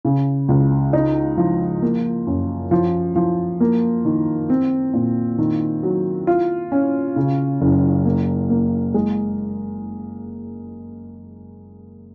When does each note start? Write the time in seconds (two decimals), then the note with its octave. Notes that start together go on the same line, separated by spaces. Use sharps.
0.05 C#3
0.49 C#2
0.93 D#4
1.37 F3
1.82 A#3
2.27 F#2
2.71 F3
3.15 F3
3.60 A#3
4.05 D#3
4.50 C4
4.93 A#2
5.38 D#3
5.83 F#3
6.27 F4
6.72 C#4
7.16 C#3
7.61 F#1
8.05 A#3
8.50 A#3
8.94 G#3